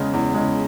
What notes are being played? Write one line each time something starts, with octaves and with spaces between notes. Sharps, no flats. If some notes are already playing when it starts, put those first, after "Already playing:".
Already playing: E2 C#3 G#3
E2
C#3 G#3